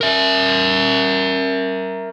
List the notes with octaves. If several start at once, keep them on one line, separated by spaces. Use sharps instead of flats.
A#4 E5